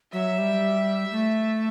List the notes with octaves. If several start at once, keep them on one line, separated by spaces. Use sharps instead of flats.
F#3 E5
G3
A3